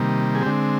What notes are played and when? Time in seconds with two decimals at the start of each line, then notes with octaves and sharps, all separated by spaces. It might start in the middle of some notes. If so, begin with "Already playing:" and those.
Already playing: C3 D#3 G3 A#3
0.35 G#4
0.43 D3 G#3 C4 G4